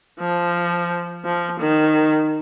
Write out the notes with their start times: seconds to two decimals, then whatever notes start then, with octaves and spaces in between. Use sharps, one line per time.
0.20 F3
1.25 F3
1.60 D#3